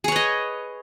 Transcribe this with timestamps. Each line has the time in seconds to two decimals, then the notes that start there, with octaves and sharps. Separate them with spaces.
0.04 G#4
0.08 C#5
0.12 B4
0.16 D#5